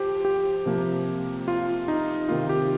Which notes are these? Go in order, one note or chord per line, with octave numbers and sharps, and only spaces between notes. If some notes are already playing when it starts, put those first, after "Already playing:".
Already playing: F3 G4 C5
G4
C3 F3 A#3
F4
D#4
C3 D#3 A#3 F4
G4